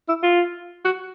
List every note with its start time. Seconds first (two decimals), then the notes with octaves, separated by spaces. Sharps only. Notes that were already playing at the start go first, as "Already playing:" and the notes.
0.08 E4
0.23 F4
0.85 F#4